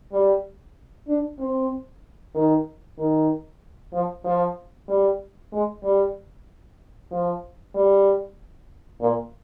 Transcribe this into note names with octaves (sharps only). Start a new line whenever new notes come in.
G3
D4
C4
D#3
D#3
F3
F3
G3
G#3
G3
F3
G3
A#2